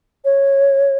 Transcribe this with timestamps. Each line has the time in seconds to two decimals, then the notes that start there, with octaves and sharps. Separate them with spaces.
0.25 C#5